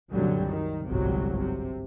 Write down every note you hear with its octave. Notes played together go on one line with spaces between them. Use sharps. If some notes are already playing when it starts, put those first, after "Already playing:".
C2 F#2 A#2 D3 F#3 G3
D#3
G1 C2 G#2 C3 F#3
C3